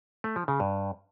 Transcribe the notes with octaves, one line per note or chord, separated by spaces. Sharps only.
A3
F3
C#3
G2